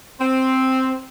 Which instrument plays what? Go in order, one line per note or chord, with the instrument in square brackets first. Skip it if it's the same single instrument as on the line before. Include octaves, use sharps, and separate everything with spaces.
[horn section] C4